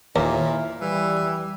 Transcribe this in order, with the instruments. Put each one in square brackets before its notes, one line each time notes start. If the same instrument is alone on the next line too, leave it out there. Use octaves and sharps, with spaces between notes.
[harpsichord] D#2 [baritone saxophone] A#2 [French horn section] E4
[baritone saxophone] E3 [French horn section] G3